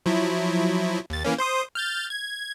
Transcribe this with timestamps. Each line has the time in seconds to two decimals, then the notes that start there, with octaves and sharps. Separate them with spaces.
0.06 F3 F#3 E4
1.10 D#2 A6
1.25 E3 A#3 C#4
1.38 C5 C6 D#6
1.75 F6 G6 A6
2.10 G#6